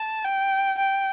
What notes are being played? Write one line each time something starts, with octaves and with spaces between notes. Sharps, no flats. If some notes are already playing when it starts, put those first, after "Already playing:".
Already playing: A5
G5
G5